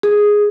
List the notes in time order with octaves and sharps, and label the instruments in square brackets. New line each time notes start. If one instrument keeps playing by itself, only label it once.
[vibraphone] G#4